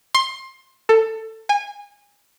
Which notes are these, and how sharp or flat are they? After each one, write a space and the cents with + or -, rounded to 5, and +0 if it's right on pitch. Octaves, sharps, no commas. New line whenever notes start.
C6 +20
A4 +20
G#5 -25